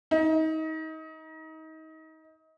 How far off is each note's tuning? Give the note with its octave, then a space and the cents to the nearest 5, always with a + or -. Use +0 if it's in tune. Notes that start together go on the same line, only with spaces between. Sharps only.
D#4 +30